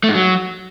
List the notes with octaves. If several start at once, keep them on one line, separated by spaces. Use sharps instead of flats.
A3
G#2
F#3